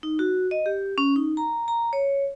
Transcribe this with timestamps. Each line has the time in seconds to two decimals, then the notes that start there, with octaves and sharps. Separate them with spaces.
0.03 D#4
0.19 F#4
0.51 D#5
0.66 G4
0.98 C#4
1.16 D#4
1.37 A#5
1.68 A#5
1.93 C#5